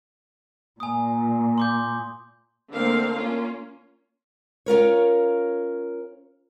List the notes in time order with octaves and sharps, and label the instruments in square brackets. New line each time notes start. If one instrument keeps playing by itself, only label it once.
[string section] A#2 [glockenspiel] G#5 D#6
[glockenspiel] C6 D6 G6
[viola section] D3 A3 A#3 C4 A#4 F5
A#3 C#4 F4
[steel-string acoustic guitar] C#4 F4 A#4 C#5